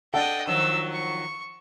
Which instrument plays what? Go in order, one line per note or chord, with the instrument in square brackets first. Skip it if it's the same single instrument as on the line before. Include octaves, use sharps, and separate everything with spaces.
[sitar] D4 A4 [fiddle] D#5 G5 [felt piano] F#5
[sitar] D#3 F3 F#3 [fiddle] E6
[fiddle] C#6